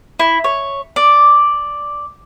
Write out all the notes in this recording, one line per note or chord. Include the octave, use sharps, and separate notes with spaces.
E4
C#5
D5